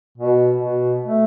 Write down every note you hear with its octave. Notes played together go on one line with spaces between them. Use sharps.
B2
B2
A3